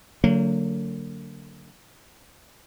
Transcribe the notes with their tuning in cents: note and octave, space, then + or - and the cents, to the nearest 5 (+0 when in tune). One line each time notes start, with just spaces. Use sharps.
D3 -25 F#3 +0 A#3 -35